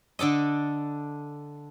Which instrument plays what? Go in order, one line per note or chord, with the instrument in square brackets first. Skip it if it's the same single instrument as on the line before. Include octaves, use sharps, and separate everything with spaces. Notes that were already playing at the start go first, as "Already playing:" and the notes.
[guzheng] D3 D4 A4 D#5